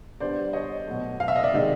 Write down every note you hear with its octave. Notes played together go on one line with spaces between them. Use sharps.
D3 G3 B3 C5 D5
C#5 D#5
B2 F#3 A3
F5
E5
D#5
D5 E5
C3 D#3 G#3